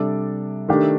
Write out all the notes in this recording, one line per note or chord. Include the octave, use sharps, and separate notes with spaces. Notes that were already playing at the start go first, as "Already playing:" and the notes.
Already playing: C3 G3 D4 A4 D5
D#3 A3 D4 G4